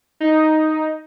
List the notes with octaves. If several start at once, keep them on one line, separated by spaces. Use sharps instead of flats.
D#4